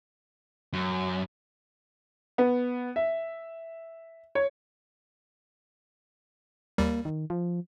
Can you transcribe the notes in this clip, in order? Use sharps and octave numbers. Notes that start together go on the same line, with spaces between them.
F#2
B3
E5
C#5
D#2 G3 A#3
D#3
F3